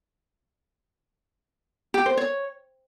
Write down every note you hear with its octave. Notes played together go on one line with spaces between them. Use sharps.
G4
C5
C#5